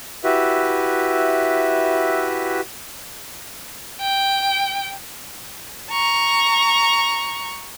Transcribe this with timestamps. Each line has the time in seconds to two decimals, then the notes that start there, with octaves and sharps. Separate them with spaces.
0.24 E4 F#4 G4 B4 E5
4.00 G5
5.91 A#5 C#6